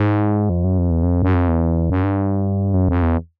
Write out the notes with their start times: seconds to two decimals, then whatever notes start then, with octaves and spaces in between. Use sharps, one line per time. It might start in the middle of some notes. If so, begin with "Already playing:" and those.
Already playing: G#2
0.50 F2
0.64 F#2
0.78 F2
0.91 E2
1.03 F2
1.23 F#2
1.34 F2
1.48 E2
1.90 F#2
2.04 G2
2.74 F#2
2.89 F2
3.03 E2